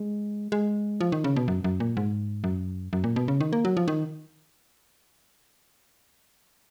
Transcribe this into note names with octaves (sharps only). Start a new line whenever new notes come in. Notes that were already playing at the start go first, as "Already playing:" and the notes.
Already playing: G#3
G#3
F3
D#3
C#3
B2
F#2
F#2
A#2
G#2
F#2
F#2
A#2
B2
C#3
D#3
A#3
F#3
F3
D#3